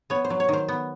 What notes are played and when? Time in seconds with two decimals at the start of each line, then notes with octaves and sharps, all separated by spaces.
0.10 B3 C#5
0.24 C5
0.30 F#3
0.40 C#5
0.49 D#3 C5
0.68 B3